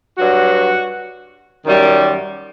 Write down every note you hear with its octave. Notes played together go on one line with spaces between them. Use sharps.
G2 F#3 F#4
F#2 D#3 G3